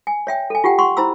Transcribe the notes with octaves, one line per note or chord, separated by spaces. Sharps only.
G#5
C#5 E5 G5
A4 G#5
F4 G4 F#5 G5
F#5 C6 C#6
E4 C5 A#5 B5 E6